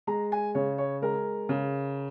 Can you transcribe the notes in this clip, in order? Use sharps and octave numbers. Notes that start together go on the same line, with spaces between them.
G#3 A#5
G#5
C#3 C#5
C#5
G#3 A#4
C#3